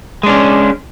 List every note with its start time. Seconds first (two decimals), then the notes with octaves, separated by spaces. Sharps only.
0.23 G#3
0.26 D4
0.29 C#4